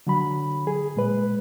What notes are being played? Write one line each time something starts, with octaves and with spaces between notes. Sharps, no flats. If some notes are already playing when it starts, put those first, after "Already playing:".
D3 F#3 B5
G#4
A#2 G#3 B4